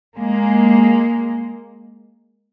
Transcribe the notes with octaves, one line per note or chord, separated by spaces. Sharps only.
G#3 A#3